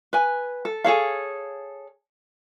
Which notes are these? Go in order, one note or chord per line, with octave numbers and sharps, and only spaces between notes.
B4 G#5
A4
G#4 A4 C#5 F5